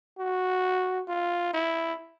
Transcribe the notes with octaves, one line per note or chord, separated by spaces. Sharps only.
F#4
F4
E4